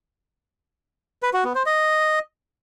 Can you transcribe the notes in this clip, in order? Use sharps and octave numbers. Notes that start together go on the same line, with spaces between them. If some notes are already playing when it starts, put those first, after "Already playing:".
B4
F#4
B3
C5
D#5